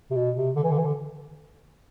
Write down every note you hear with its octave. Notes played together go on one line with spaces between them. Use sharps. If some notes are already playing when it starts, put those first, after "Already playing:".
C3
B2
C3
D3
E3
D3
E3
D3